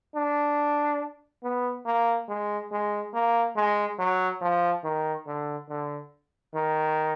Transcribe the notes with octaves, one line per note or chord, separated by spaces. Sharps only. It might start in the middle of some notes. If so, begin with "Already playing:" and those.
D4
B3
A#3
G#3
G#3
A#3
G#3
F#3
F3
D#3
D3
D3
D#3